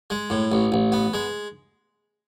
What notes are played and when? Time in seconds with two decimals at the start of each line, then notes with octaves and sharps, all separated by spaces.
0.10 G#3
0.30 A2
0.52 A1
0.72 A1
0.92 B3
1.14 G#3